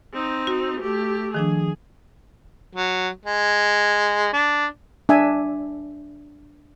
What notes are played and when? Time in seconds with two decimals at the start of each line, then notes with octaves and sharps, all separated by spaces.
0.13 C4 D#4
0.47 F#4
0.80 A3 G4
1.34 D#3 F3 D4 G#4
2.75 F#3
3.25 G#3
4.33 D4
5.09 D4 E5 G#5